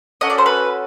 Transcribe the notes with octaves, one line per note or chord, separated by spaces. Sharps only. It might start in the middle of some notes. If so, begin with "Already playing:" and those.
C#4 F#4 A4 D#5
D5
C5
B4